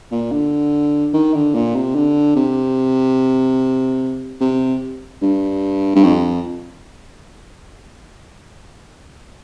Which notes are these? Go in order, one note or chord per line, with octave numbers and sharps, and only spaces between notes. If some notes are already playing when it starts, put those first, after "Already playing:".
A#2
D3
D#3
D3
A#2
C3
D3
C3
C3
G2
G2
F2